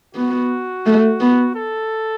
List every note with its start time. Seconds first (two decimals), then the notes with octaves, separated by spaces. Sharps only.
0.15 B3 F#4
0.86 A3
1.20 B3
1.55 A4